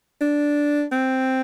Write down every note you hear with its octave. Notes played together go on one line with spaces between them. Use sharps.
D4
C4